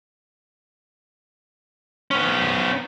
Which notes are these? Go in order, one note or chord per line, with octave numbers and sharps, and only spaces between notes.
B3 C#4